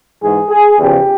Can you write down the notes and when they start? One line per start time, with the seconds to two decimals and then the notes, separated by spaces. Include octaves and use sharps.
0.21 G#2 E3 G#4
0.49 G#4
0.78 E2 C#3 F3 G4